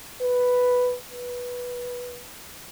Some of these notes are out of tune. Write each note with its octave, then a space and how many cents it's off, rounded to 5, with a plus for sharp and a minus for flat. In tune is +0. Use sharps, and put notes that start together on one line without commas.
B4 +0
B4 -10